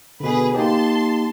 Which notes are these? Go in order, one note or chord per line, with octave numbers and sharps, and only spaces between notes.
B2 D3 G#4 B4
A#3 D#4 G4 A5 C6